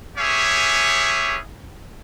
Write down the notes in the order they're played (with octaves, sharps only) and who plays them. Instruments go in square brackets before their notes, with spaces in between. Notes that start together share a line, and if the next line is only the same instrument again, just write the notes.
[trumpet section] B3 C#4 G4 G#4 C#5 E5